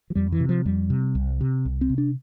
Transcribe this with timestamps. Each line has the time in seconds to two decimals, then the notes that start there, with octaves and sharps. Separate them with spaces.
0.10 F3
0.15 F2 G3
0.32 E3
0.40 C3
0.49 F3
0.66 F2 G3
0.90 C3
1.15 C2
1.41 C3
1.65 C2
1.81 C4
1.90 C3
1.98 D4